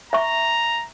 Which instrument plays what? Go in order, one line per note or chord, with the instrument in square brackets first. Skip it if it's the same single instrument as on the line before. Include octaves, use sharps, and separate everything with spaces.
[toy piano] E5 C#6 [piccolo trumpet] A#5